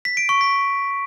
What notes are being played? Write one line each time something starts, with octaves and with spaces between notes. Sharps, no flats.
B6
D7
C#6
B6